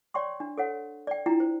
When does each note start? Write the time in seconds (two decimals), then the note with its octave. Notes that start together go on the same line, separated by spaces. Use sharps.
0.14 C#5 D5 G5 C6 C#6
0.40 D4
0.58 A4 C#5 F#5
1.07 D5 G5
1.26 D4 E4 F4 G5 A#5
1.40 C5